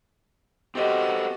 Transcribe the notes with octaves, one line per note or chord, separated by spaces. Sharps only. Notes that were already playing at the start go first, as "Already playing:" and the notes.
C4 F#4 G4 A4 B4 D#5 A5